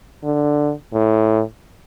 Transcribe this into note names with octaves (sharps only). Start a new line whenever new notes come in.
D3
A2